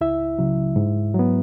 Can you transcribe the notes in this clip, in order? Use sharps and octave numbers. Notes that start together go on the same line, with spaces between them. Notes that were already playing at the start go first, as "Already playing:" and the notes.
C#2 E4 E5
C#3 F#3
G#2
F#3
B3